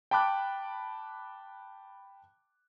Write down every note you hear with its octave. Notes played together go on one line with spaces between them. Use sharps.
G5 A5 B5 D6 F#6